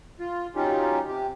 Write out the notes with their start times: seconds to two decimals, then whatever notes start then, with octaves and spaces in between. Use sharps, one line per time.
0.20 F4
0.55 F#3 C#4 D#4 F4 G4
1.07 C3 G4